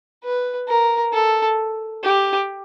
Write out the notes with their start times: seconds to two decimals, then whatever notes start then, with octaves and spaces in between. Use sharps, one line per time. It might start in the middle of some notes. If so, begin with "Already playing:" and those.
0.24 B4
0.68 A#4
1.13 A4
2.04 G4